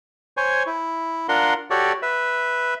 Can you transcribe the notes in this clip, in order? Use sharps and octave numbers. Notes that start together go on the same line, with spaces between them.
C5 C#5 G#5
E4
D4 F4 A#4 F#5 C6
F#4 G4 A4 C#5 D5
B4 E5